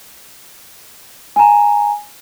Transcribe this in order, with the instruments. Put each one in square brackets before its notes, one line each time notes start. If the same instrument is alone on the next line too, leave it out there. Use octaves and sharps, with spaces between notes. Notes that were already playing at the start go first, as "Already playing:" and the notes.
[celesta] G#5 A#5